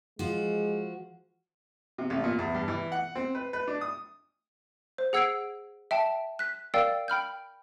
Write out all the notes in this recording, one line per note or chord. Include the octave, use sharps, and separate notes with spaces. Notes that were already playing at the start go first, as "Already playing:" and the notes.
F3 G#3 F#4
C3
A1
A#2
E2
G2
E3
F#5
C4
B4
B4
D4
D#6
C5
G#4 F#5 E6 G#6 C7 D7
E5 G5 A5
F#6 B6
A#4 D5 F5 G5 E6 A6
G5 B5 F6 G6